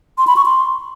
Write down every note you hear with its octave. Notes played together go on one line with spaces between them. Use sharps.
C6
B5
C#6
C6